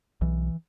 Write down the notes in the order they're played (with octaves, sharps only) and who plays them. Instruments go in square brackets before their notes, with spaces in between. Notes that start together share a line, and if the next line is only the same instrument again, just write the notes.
[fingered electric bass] B1 E3